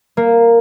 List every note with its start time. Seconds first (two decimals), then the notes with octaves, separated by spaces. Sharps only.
0.17 A#3